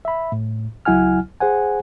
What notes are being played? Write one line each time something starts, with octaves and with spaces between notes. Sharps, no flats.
E5 B5
A2
C#2 F#3 E4 F#5 G#5 F6
G#4 C5 F#5 G#5